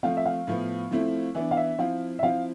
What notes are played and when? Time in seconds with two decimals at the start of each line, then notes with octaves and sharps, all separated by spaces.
0.03 F3 A3 C4 F5
0.17 E5
0.26 F5
0.47 A2 F3 B3
0.91 F3 A3 C4 E4
1.35 E3 B3 D4 E5
1.51 F5
1.57 E5
1.79 F3 C4 E4 F5
2.19 E5
2.23 F3 C4 E4 F5